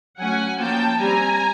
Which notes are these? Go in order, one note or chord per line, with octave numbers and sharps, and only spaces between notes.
F#3 A3 C#4 F#5 G#5
F3 A#3 C#4 G5 A5
G3 C4 G#5 A#5